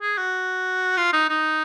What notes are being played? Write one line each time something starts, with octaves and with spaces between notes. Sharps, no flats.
G#4
F#4
F4
D#4
D#4